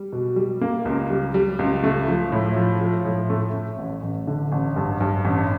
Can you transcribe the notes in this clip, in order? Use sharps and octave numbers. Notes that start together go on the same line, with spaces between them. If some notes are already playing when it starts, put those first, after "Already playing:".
Already playing: G3
B2
G3
A#3
C#2
G3
G3
C#2
A3
F3
A2
F3
F3
A2
A3
A3
A1
A1
D3
A1
G2
G2
A1